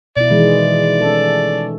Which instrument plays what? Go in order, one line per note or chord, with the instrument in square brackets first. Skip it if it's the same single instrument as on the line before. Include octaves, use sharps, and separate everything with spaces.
[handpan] B2 E4 [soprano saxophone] D5
[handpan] D#3 E3 G#3
C#4 A4